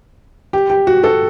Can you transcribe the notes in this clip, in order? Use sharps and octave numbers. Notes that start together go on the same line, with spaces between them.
G4
G4
F#4
F#4 A4